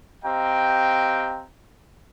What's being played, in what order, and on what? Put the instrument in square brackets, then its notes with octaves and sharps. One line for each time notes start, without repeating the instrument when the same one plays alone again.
[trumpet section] C4 G4 D#5 F5 G5 A#5